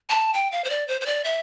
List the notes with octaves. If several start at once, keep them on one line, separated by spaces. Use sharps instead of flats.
A5
G5
F5
C5
D5
C5
C5
D5
E5